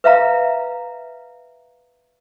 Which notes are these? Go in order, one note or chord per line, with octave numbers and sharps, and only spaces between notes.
B4 E5 F5 A#5